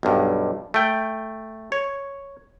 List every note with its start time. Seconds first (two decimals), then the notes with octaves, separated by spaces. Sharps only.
0.03 B1 G2
0.74 A3 G5
1.72 C#5